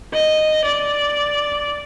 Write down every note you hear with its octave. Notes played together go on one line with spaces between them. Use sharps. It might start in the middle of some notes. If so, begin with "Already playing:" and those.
D#5
D5